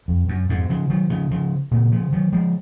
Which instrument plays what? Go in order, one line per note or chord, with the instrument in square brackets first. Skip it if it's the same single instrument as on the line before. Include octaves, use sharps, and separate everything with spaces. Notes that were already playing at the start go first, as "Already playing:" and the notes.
[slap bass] F2
F#2
F2 G#2
C#3 F3
D#3 F#3
C#3 F3
C#3 F3
A#2 C#3
C#3 F3
D#3 F#3
F3 G#3